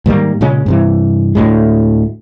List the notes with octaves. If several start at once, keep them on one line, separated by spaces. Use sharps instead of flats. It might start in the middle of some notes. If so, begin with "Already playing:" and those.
G#2 D#3 G3 A#3
A#2 C#3 G#3 C#4
G2 C3 E3
D2 A2 G#3